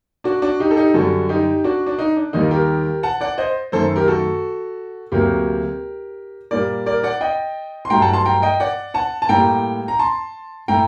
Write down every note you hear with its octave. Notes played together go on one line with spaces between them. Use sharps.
D4 F#4
D4 F#4
D#4 G4
A4
D#4 G4
F#2 D3 G3 F#4 A4
D#4 G4
D4 F#4
D4
D#4
D4
D#2 D#3 G3 A#3 D#4
G4 A#4
F#5 A5
D5 F#5
C5 D#5
F#2 D#3 A3 A4 C5
G4 A#4
F#4 A4
D2 C3 F#3 A#3 G4 A#4
A#2 G3 A#3 A#4 D5
A#4 D5
D5 F#5
D#5 G5
C6
G2 F#3 A3 G5 A#5
F#5 A5
A5 C6
G5 A#5
D#5 G5
D5 F#5
F#5 A5
A5
A2 G3 A#3 G5 A#5
A#5
A5 C6
A2 A3 G5 A#5